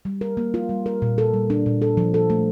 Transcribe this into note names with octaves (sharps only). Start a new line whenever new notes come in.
G3
A#4
A#3
F4
G3
A#4
A#2
A4
G3
D4
A#2
A4
F3
A4
A3